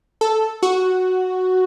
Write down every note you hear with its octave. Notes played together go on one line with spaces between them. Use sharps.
A4
F#4